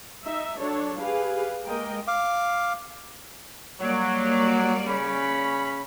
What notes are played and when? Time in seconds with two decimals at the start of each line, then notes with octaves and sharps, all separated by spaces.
0.24 D#4 E5
0.58 F#3 D4 A4 C#5
0.99 G4 G#4 B4 F5
1.66 G#3 A#3 A#4 D#5 G5
2.08 F5 D6
3.80 F#3 G3 A#3 D5
4.86 C#3 C#4 B5